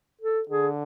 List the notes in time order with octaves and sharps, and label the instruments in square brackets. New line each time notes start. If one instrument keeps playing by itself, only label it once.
[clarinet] A4
[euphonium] D3 [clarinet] G#4